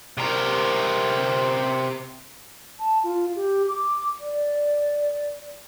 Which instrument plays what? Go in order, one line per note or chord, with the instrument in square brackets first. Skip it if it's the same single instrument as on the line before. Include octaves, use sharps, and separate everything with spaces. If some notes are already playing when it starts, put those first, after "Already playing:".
[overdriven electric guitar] C3 A#4
[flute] A5
F4
G4
D6
[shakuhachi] D5